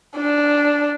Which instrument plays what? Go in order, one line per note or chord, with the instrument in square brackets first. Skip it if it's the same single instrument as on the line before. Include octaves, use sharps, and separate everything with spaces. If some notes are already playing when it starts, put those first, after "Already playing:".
[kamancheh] D4